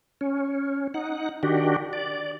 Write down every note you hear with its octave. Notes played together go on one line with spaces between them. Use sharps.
C#4
D#4 F#5
D#3 D4 F#4 G4
D5